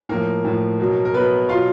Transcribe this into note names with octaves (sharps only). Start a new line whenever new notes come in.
A2 F3 A#3 A#4
A2 F3
B2 F#3
A#4
B2 F#3 B3 B4
B2 F#3 F4 F5